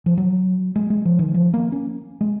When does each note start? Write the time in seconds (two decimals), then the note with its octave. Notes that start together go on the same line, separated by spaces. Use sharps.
0.06 F3
0.17 F#3
0.76 G#3
0.90 G#3
1.05 F3
1.19 D#3
1.34 F3
1.54 A#3
1.72 C#4
2.21 G#3